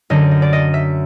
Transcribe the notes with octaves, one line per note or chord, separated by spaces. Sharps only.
F#2 D3 D#5
D#5
D5
D#5
E5